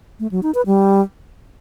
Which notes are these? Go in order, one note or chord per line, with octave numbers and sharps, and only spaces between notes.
A3
F#3
D#4
B4
G3